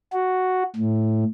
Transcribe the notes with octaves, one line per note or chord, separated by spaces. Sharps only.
F#4
A2